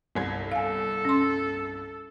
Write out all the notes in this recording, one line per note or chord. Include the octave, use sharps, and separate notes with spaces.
G1 C2 G#6
A4 F5 G#5
C#4 C6